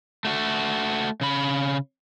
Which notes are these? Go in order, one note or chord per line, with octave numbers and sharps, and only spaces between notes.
A3 F#4
C#3 B5